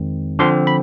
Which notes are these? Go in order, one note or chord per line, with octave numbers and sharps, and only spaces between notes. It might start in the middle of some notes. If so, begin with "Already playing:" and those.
Already playing: F2 D#3 G#3 C4
D3 F3 C4 C6
B5